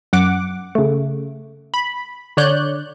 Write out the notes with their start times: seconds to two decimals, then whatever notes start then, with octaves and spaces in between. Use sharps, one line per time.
0.13 F#2 F#5 D6
0.75 C#3 A3
1.74 B5
2.37 D3 C#5 D5 F#6 G6